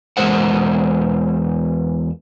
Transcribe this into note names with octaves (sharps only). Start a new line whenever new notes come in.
E2 D#3 G#3 A#4 C5 F#5